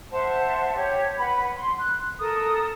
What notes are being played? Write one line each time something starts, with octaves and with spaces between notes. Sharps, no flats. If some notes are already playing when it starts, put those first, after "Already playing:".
C5 E5 F#5 A5
G4 C#5
B4 F#5 B5
C6
F#6
A4 A#4 D#6